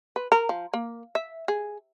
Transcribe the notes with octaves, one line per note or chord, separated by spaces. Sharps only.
B4
A#4
F3
A#3
E5
G#4